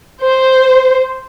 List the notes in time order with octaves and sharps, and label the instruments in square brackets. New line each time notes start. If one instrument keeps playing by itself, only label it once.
[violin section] C5